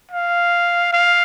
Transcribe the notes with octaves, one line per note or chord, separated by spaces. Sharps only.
F5
F5